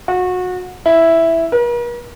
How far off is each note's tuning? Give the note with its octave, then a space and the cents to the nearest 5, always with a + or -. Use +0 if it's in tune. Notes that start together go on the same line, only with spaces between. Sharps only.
F#4 -25
E4 +0
A#4 +45